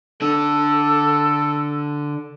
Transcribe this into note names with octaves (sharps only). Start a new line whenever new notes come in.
D3 D4 A4